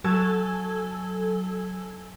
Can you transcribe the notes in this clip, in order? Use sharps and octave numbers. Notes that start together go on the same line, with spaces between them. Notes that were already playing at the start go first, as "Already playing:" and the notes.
F#3 A4 G#5 A5 E6 G#6